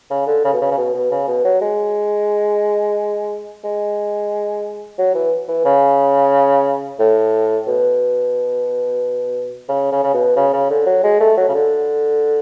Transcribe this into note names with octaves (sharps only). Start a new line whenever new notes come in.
C#3
D3
C#3
B2
C#3
C#3
B2
B2
C#3
B2
F#3
G#3
G#3
F#3
E3
E3
C#3
A2
B2
C#3
C#3
C#3
B2
C#3
C#3
D3
F#3
G#3
A3
F#3
C#3
D3